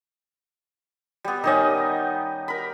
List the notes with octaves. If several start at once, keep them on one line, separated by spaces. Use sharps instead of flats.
G3 B3
D#3 C#4 D#4 G4 D#5
A#4 B5